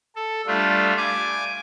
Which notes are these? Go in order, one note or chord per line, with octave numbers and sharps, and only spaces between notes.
A4
G3 A3 D4 F4
G#5 D6